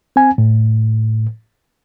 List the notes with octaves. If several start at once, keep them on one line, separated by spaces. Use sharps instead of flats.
C4 G#5
A2